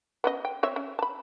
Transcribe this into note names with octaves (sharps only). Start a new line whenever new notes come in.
B3 C#4 D#5
G5
C4 C#5 E5
C#4
A5 B5